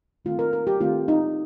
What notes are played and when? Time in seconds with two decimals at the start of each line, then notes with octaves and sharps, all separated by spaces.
0.25 D#3 A3 C4 F4
0.39 A#4
0.53 A#4
0.67 G4
0.80 D#3 A3 C4 F4
1.08 D#4